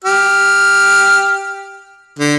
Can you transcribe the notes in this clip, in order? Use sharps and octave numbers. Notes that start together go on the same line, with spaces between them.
G4 F6
D3